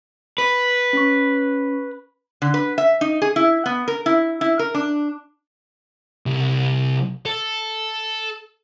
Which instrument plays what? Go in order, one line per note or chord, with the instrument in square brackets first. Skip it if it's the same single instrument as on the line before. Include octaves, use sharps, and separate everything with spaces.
[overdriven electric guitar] B4
[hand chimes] C#4 C#6
[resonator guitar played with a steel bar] D3
B4
E5
D#4
G#4
E4
B3
A#4
E4
E4
A#4
D4
[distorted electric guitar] C2
A4